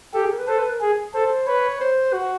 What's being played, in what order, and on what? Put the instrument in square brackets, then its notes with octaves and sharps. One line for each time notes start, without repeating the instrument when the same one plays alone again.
[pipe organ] G4 [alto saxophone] A4
[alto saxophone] G#4
A#4
B4
[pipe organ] A4 [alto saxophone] C5
[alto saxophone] B4
A#4
[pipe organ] G#4
[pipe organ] A4 [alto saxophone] C5
[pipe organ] B4 [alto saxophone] C#5
[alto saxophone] C5
F#4